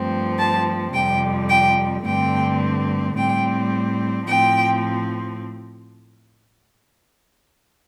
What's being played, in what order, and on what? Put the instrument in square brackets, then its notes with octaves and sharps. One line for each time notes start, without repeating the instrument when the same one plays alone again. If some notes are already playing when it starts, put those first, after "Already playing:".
Already playing: [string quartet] G2 F3 A3 C4
A5
F2 C3 G3 G5
G5
G2 D3 A3 C4 G5
A2 G3 C4 G5
A2 F3 C4 G5